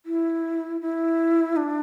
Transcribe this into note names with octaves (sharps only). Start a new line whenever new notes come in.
E4
E4
D4